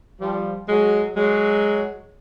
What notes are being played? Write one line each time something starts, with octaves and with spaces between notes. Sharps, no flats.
F3 G3
F#3 G#3
F#3 G#3